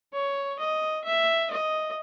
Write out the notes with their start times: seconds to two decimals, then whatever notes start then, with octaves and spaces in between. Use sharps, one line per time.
0.13 C#5
0.59 D#5
1.05 E5
1.51 D#5